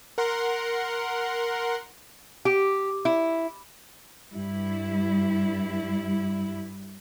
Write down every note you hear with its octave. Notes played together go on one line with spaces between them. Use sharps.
A#4 F#5 C6
G4
E4
G2 G3 E4